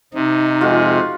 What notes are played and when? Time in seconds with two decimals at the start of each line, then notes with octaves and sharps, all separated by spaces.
0.14 C3 D#4
0.61 F2 G#3 F4 F#4